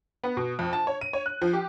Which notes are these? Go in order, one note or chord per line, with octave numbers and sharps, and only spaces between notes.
B3
B2
F2
A5
C#5
D#7
C#5
F#6
F3
G4